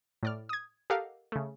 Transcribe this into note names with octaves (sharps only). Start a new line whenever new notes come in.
A2 D5 F6
D#6 G#6
G4 A4 A#4 D#5 F5 F#5
C#3 A3